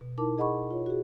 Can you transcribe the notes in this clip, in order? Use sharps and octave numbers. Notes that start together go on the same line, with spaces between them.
B2
D#4 E4 A#4 A5 D6
G#4 D#5 F#5 B5 C#6
F4 C#5
F#4 G#4